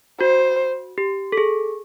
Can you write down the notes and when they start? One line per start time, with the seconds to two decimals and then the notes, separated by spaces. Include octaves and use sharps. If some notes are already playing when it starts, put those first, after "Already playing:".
0.20 F#4 C5
0.98 G4
1.32 A4
1.38 G#4